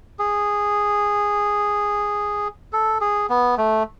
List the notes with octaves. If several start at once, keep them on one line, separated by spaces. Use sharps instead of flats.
G#4
A4
G#4
B3
A3